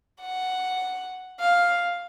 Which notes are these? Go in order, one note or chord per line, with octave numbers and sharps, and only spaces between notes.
F#5
F5